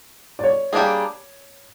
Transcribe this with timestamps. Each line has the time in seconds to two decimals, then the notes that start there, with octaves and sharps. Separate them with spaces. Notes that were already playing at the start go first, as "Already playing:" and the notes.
0.39 D5
0.44 C#5
0.73 G3 A#3 D4 F4 G#4